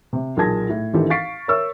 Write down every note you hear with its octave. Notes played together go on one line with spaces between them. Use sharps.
C3
B1 A#2 G#4 A5 G#6 A#6
A2
G#1 E3 D4 G4 A4
F5 C#6 A6 B6 C7 D7
A#4 C#5 E5 C#6 E6